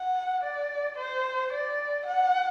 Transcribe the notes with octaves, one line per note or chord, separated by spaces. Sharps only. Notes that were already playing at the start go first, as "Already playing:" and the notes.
Already playing: F#5
D5
C5
D5
F#5